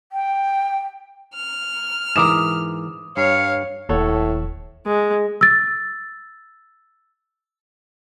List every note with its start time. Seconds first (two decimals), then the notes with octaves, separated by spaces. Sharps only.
0.12 G5
1.36 F6
2.16 G#2 E3 A#4 D6 D#6 E7
3.17 G2 C#5 F5
3.89 D1 D#2 A2 A4 C#5 F#5
4.86 G#3
5.41 E6 A6